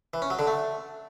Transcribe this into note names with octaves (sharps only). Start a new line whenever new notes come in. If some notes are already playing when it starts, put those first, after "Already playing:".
E3
C#4
F#3
D3
A3